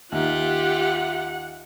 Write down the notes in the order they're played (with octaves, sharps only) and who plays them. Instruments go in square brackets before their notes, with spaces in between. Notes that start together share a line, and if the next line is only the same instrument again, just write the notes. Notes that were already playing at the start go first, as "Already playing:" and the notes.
[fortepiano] D#2 [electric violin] F4 G4 [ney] E5 [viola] F#5